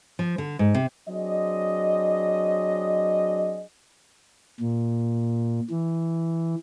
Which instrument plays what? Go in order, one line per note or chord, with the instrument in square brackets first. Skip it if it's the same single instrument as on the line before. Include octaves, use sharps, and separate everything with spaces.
[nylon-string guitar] F3
D3
G#2
C3
[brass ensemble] F#3 C4 D4 G#4 D#5
[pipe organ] A#2
E3